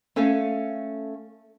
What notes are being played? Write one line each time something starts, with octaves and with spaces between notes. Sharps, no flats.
A3 C#4 A4 F5 G#5